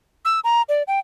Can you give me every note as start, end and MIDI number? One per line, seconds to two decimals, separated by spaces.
0.25 0.40 88
0.44 0.62 82
0.69 0.83 74
0.88 0.99 79